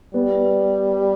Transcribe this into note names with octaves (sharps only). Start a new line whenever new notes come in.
G3 B3